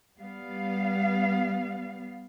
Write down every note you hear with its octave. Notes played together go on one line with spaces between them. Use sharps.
G3 B3 F5